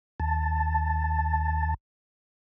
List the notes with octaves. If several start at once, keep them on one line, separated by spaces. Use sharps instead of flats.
D#2 A5